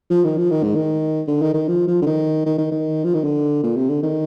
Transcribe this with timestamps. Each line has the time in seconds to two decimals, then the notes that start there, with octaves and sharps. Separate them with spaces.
0.10 F3
0.24 D#3
0.38 F3
0.51 D#3
0.63 G#2
0.76 D#3
1.28 D3
1.42 D#3
1.54 D#3
1.68 F3
1.88 F3
2.02 D3
2.06 D#3
2.46 D#3
2.58 D#3
2.71 D#3
3.04 F3
3.14 D#3
3.24 D3
3.63 A#2
3.76 C3
3.89 D3
4.03 D#3